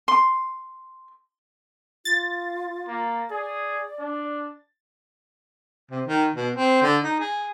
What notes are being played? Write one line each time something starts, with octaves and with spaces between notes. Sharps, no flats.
C6
F4 A6
A#3
G#4 D5
D4
C3
D#3
B2
C4
D3
D#4
G#4